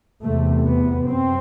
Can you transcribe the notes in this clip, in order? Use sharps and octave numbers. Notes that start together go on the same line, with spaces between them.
E2 C3 A3
B3
F#2 C4